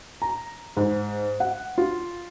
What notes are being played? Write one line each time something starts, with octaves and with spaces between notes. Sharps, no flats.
A#5
G#2
F#5
F4